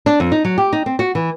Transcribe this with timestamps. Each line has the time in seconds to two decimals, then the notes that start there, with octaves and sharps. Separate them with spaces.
0.06 D4
0.20 F2
0.32 D#4
0.45 F#3
0.58 G4
0.73 D#4
0.86 C4
0.99 F#4
1.15 E3